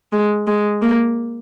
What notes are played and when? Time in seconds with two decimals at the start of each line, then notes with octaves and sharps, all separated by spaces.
0.12 G#3
0.47 G#3
0.82 A#3